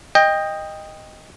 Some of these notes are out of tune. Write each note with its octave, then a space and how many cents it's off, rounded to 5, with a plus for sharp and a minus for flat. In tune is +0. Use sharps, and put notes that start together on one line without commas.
D#5 +0 G5 +20